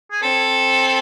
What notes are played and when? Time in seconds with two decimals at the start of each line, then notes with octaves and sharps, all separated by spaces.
0.11 G#4
0.22 C4 A4